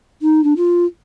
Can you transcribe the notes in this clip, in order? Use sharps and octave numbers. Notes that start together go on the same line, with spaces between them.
D#4
D4
F4